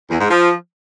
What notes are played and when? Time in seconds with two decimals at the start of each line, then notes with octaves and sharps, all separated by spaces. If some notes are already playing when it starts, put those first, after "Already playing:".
0.10 E2
0.21 G#2
0.31 F3